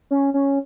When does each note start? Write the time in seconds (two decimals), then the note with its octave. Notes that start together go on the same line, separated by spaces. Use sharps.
0.11 C#4
0.34 C#4